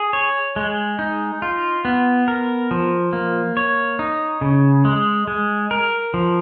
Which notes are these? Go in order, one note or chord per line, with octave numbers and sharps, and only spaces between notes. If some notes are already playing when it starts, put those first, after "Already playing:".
Already playing: G#4
C#5
G#3
D#4
F4
B3
A#4
F3
A#3
C#5
D#4
C#3
G#3
G#3
A#4
F3